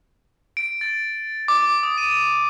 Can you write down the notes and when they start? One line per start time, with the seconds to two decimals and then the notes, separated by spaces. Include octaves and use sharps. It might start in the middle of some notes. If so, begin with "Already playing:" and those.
0.57 D7
0.81 A6
1.48 D6
1.83 D#6
1.98 D#7